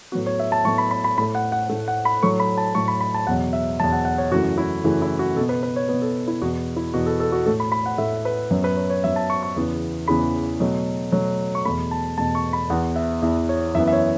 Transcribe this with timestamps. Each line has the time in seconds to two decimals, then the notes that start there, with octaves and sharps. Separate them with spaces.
0.12 A2 F#3 B3 F#4
0.26 C#5
0.39 E5
0.52 A5
0.65 A2 F#3 B3 C#6
0.78 B5
0.91 B5
1.04 B5
1.18 A2 B5
1.21 A3
1.35 F#5
1.52 F#5
1.69 A2 A3
1.88 F#5
2.05 B5
2.22 A2 F#3 A3 C#6
2.40 B5
2.58 A5
2.75 A2 F#3 A3 C#6
2.88 B5
3.01 B5
3.14 A5
3.27 E2 B2 F#3 F#5
3.53 E5
3.80 E2 B2 F#3 A5
3.92 F#5
4.05 F#5
4.18 C#5
4.32 F#2 C#3 E3 A3 F#4
4.58 E4
4.84 F#2 C#3 E3 A3 F#4
5.02 E4
5.19 F#4
5.36 B2 A4
5.41 B3
5.49 B4
5.63 B4
5.76 C#5
5.89 B2 B3 B4
6.02 A4
6.28 E4
6.42 E2 B2 B3 F#4
6.76 E4
6.94 E2 B2 B3 F#4
7.06 A4
7.20 A4
7.32 F#4
7.46 A2 A3 A4
7.60 B5
7.72 B5
7.86 F#5
7.98 A2 A3 E5
8.25 B4
8.50 F#2 F#3 B3
8.64 B4
8.77 C#5
8.90 C#5
9.03 F#2 F#3 B3 E5
9.16 A5
9.30 C#6
9.43 C#6
9.56 E2 C#3 E3 B3
10.08 E2 C#3 E3 B3 B5
10.60 B2 F#3 A3
11.12 B2 F#3 A3
11.55 C#6
11.65 E2 B2 A3 B5
11.91 A5
12.17 E2 B2 A3 A5
12.35 C#6
12.53 B5
12.70 E2 E3 B3 F#5
12.96 E5
13.22 E2 E3 B3 E5
13.49 C#5
13.75 F#2 E3 B3 E5
13.88 E5
13.93 C#5